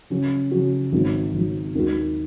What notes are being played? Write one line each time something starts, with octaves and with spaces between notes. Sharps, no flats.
C#3 F#3 C#4 F#4
C#3 F#3 C#4 F#4
G#1 G#2 F#3
G#1 G#2 F#3
D#2 D#3 G#3 D#4 F#4